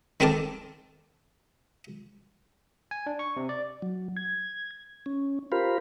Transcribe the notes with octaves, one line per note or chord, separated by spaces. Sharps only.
D#3 C4 A4 A#4 A5 D6
G#5
D4
C#6
C3
D5
F#3
G#6
C#4
F4 G4 A#4 C5 F5 B5